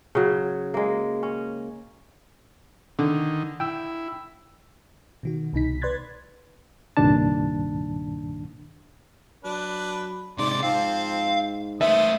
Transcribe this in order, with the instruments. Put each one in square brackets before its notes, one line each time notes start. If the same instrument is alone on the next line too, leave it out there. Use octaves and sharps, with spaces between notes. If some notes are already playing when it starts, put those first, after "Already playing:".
[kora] C#3 F#3
G#3 A#3
C#4
[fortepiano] D3 [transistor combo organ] D#3
[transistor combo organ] E4 [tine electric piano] G5 E6
[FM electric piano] B2 D#3 F#4
C2 B2 D#4 B6
B4 D5 C6 F#6 G#6 A6
[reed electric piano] C2 G2 A#2 D#3 D4 A5
[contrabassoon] F#3 [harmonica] D4 B4
[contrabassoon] G#2 [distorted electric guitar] C3 D#3 [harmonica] D5 C6
[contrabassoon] G#2 [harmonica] F3 C4 [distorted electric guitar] F5
[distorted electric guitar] A3 B3 [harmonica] C5 D#5 [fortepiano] E5